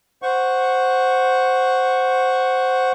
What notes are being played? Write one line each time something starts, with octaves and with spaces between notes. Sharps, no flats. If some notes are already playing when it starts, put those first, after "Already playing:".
C5 F#5 C#6